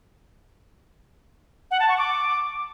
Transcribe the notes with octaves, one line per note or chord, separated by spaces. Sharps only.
F#5
A5
C#6
D6